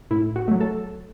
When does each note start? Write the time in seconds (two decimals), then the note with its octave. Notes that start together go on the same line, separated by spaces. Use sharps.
0.11 A2 E4
0.36 F#4
0.48 F#3 A3
0.61 A4